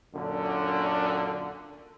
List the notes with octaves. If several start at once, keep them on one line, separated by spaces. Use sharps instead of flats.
F#2 A#2 D3